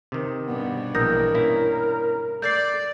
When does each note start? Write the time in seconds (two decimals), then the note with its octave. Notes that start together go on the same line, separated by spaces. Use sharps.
0.12 C3 D#3
0.47 G2 B2 B3
0.95 A#1 E3 A#4 D#6 G6 A#6
1.34 A#3 C#4 E4
2.42 A3 D5 G6 A6 C7